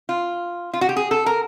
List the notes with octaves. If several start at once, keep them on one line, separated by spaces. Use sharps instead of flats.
F4
F4
F#4
G4
G#4
A4
A#4